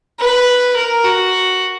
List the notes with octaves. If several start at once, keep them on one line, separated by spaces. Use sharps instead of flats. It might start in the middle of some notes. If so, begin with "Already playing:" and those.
B4
A#4
F#4